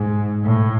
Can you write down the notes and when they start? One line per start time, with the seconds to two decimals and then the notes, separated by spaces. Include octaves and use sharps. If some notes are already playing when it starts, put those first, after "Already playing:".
Already playing: G#2
0.44 A2